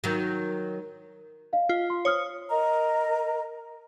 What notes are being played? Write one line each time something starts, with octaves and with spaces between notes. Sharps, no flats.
D#3 F#3
D#5 F5
F4
C6
C5 C#5 D#6 F6
A#4 D#5 A#5